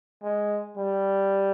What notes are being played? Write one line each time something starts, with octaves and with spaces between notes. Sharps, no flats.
G#3
G3